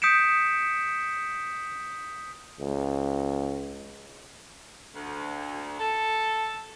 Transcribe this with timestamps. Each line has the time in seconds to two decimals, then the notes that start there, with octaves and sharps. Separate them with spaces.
0.02 D#6 G6 B6 C#7 D7 E7
2.60 C#2
4.95 D2
5.80 A4